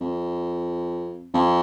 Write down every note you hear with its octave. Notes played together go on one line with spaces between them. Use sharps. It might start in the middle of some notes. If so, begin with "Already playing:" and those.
F2
F2